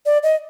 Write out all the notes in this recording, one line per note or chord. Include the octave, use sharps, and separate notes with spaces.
D5
D#5